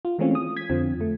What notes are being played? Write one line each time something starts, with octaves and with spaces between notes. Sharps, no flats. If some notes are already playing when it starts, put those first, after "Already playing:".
F4
E3 G#3 A3 C4 C#4 F4
D#6
G#6 B6
F2 D3 F3 C4
A3